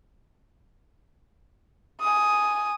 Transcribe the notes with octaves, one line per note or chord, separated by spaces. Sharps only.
G#5 D#6